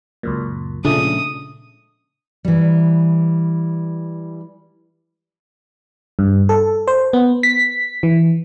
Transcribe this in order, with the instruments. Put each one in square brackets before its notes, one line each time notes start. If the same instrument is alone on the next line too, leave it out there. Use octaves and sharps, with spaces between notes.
[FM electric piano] C#2 F#2 A#2
[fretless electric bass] A#2 C#3 [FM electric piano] F3 G#3 A3 [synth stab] D4 [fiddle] D#6
[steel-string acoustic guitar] E3 G3
[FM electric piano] G2
A4
C5
B3
B6
E3